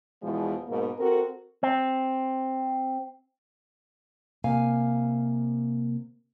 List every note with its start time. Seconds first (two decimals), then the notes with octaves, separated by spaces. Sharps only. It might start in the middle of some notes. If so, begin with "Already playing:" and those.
0.23 E2 B2 E3 F3 G#3
0.68 G#2 B2 A#3
0.99 C4 F#4 A4 A#4
1.63 C4
4.44 C3 A#3 F5 G#5